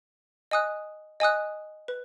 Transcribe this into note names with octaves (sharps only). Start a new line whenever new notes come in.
D#5 G#5 D#6 F#6
D#5 G#5 D#6 F#6
B4